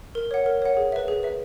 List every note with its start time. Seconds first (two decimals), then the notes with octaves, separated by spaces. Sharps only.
0.15 A#4
0.31 C#5 F#5
0.46 A#4
0.62 C#5 F#5
0.77 G#4
0.92 B4 E5
1.08 G#4
1.23 B4 E5